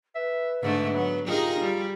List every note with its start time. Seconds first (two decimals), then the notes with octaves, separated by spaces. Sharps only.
0.15 B4 E5
0.62 G#2 D3 A3 E5
0.94 F#3 B3
1.27 D#4 F4 G4 G#4 A#4
1.61 G3